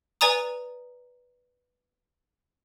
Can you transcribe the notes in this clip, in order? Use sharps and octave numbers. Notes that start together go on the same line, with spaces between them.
B4 D5 G#5 A#5 D#6